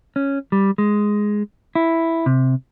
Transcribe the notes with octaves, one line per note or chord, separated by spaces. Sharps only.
C#4
G3
G#3
E4
C3